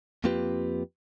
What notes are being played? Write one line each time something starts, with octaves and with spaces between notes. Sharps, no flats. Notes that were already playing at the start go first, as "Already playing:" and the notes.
F2 A#3 C4 F4 G4 B4